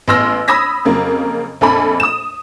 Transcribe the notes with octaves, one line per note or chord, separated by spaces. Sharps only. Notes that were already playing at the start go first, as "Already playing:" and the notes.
A1 B3 C6 E6 F6 A#6
B5 D#6 E6 G#6 A#6 B6
F2 C#3 F#3 A#3
A#1 F2 A4 G#5 B5
D#6 E7